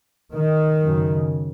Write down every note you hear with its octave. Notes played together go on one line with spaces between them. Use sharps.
D#3
F#2 C#3